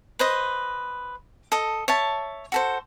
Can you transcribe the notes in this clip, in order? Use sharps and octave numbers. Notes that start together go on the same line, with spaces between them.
B4 C5 D#5
A4 D#5
C#5 E5 A5
F#4 A4 C5